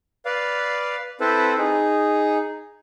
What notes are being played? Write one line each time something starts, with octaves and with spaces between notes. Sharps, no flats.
B4 D5 F5
C4 E4 A4 B4 C5
D#4 G#4